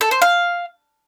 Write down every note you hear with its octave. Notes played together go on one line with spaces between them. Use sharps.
A4
C5
F5